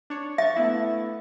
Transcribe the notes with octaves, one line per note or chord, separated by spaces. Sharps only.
D4 C#5
E5 C#6 A6
A3 B3 E4